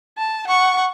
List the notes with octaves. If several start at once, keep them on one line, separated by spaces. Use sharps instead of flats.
A5
F#5 C#6